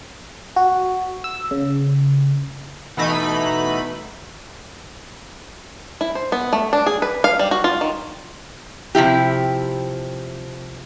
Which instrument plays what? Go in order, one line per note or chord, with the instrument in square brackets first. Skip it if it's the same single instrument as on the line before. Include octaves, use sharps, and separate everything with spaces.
[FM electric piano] F#4
E6
C#3
[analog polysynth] B2 E3 A3 D#4 B5 B6
[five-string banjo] E4
C5
B3
A3
D4
G#4
B4
F5
G3
F#4
F4
D#3
[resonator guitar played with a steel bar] C3 F3 E4 G4